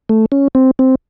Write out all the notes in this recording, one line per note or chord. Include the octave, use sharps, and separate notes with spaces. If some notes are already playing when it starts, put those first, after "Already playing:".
A3
C#4
C4
C4